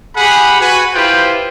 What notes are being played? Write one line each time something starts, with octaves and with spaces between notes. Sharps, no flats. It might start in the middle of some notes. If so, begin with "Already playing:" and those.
G4 G#4 F#5 B5
F#4 B4 G#5
E4 F4 G4 B4 C5 G5